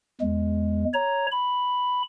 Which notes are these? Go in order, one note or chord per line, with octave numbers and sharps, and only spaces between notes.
E2 G#3
C#5 A#5
B5